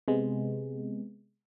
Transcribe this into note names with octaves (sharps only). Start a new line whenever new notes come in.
C3 G#3 B3